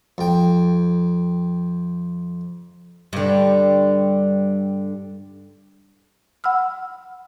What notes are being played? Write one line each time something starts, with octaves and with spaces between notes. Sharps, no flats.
F2 G5
G2 D3
F#5 B5 E6 F6